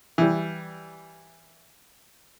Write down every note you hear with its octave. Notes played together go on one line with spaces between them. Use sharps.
E3 G3